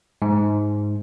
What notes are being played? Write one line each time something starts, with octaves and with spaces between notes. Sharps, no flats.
G#2